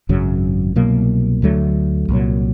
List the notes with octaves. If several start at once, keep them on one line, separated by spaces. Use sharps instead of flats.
G#1 F#2 C#3 F#3
C2 B2 F#3 A#3
D2 D3 F#3 A3
C2 A#2 F#3